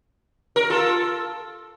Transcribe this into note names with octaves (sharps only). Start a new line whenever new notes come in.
A#4
F4 A4